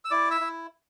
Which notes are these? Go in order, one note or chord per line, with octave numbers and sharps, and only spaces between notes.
E6
E4 D5 D6
E5 E6
E4